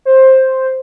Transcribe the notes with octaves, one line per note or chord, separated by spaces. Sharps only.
C5